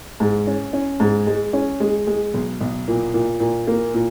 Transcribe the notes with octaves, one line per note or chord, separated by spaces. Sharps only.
G#2
C#4
C#4
G#2
G#3
C#4
G#3
G#3
B1
B1
A#2
A#2
A#2
A#3
A#2